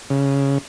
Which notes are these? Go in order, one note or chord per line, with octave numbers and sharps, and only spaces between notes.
C#3